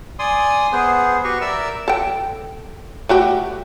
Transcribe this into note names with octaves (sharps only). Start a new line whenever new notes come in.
D5 G#5 C6 D#6
B3 G#4 C5
F#4 G4 B4 C#6
A#4 D5 E5 E6
A4 G5
A3 F#4 G4